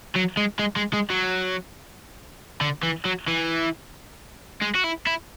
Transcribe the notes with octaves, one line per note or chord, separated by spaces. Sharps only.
F#3
G#3
G#3
G#3
G#3
F#3
D3
E3
F#3
E3
G#3
F#4
E4
E4